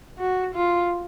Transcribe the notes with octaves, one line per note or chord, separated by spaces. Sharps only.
F#4
F4